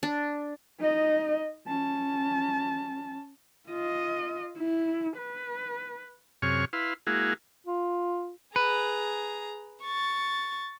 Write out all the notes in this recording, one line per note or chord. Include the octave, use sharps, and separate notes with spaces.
D4
D#4 D#5
C#4 A5
F4 D#5
E4
B4
F#2 C3 G#4 C#5 C#6 F6
E4 B4 F5 C6
G#3 A#3 E4 F#4 G#4 F5
F4
G#4 B4 A#5
C#6 A6